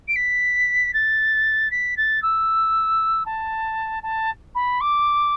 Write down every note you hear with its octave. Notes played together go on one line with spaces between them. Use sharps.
D7
B6
A6
B6
A6
E6
A5
A5
B5
D6